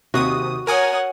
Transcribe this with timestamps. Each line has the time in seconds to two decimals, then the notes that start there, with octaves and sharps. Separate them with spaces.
0.14 D#2 C3 F#4 D#6
0.67 A#4 C#5 F#5 G#5 D#6